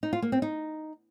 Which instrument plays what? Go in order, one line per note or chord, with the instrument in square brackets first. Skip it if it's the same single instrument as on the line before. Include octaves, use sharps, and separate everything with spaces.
[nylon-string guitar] D#4
F4
A#3
C4
D#4